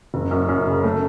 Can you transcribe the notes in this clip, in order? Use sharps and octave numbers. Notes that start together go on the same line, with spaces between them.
F#1
F#2
F#2
C#3
A3